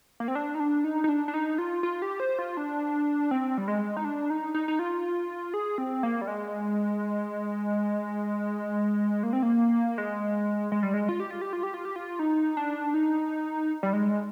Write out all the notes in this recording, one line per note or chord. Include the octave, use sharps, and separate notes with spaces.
A#3
C4
D4
D#4
D4
D#4
D#4
D4
D4
D#4
F4
F4
G4
C5
F4
D4
C4
G3
G#3
D#4
D4
D#4
D#4
D#4
F4
G#4
C4
A#3
G3
G#3
A#3
C4
A#3
G#3
G#3
G3
G#3
F4
G4
F4
G4
F4
G4
F4
G4
F4
D#4
D4
D#4
G3
G#3